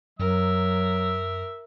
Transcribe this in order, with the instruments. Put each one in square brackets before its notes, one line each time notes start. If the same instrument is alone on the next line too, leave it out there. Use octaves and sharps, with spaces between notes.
[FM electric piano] F#2 [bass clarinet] F#3 [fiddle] A#4 [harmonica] E5